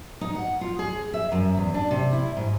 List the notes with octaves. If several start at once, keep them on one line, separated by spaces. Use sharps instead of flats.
D#4
F#5
F4
G#4
E5
F#2
E2
D4
C3
E4
G#2